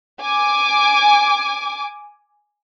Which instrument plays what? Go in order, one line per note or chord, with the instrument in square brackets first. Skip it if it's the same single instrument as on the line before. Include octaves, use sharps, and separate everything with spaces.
[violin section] G#5 D6